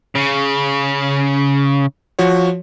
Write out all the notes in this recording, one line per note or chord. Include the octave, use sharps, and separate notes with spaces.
C#3
F3 F#4 C#5